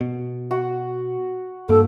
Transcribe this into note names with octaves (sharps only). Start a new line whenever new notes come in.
B2
F#4
G2 A#3 A4